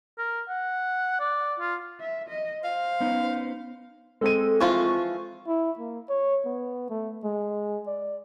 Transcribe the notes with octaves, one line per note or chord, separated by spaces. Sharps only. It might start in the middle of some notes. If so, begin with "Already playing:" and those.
A#4
F#5
D5
F4
E5
D#5
C5 F5
B3 C#4 D#4
G#3 C4 A4 D#7
E3 F3 F4 C#6
E4
A#3
C#5
B3
A3
G#3
D5